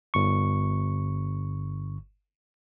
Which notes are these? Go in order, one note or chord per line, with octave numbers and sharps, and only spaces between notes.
G1 C#6